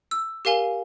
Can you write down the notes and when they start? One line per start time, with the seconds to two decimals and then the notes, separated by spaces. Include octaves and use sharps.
0.11 E6
0.45 G4 A#4 F5 G#5 G7